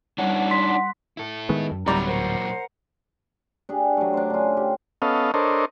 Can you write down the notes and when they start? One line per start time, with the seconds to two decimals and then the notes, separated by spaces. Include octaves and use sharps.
0.18 G3 D4 D#4 C#5 F#5
0.51 C6 B6
1.17 E4 A4
1.49 D#3 G#3 B3
1.71 F#2
1.86 D1 F#2 F#3 G3 B3 A#5
2.06 A#2 F#3 A#4 C5 F#5
3.69 D4 G4 G#4
3.97 F#3 A3
4.14 D4 C5
4.30 C#3 F4
4.57 G4
5.02 B3 C#4 A4 D#5 F5
5.34 D4 A4 A#4 C5 C#5 D#5